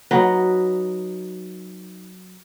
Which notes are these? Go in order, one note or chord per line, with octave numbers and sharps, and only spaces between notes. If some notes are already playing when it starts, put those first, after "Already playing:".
F#3 D#4 B4